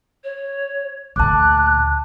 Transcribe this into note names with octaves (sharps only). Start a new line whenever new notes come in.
C#5
D2 A#2 A5 D6 F#6